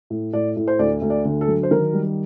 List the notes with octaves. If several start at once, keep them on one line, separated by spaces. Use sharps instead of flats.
A2
A2 D5
A2
C5
D2 D5
D2
D5
D3
A4
F#3
C5
D#3 A#4
G3